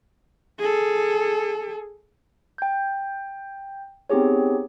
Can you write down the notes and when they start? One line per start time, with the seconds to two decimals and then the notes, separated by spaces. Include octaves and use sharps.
0.59 G#4 A4
2.58 G5 G6
4.10 B3 C4 D#4 G4 G#4 C#5